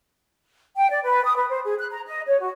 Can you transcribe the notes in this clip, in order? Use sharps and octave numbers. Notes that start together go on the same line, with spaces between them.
G5
D5
B4
D#6
B4
C5
G#4
F#6
A#5
D#5
C#5
F#4